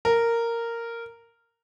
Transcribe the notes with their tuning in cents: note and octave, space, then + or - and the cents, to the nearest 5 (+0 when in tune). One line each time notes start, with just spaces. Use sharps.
A#4 -10